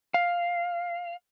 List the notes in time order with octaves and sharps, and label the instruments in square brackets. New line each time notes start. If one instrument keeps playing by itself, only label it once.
[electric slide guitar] F5